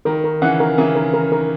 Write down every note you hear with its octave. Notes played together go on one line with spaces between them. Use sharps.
D#3 A#4
A#4
C#3 E3 F#5
A#4
C#3 E3 A#4
A#4
A#4
A#4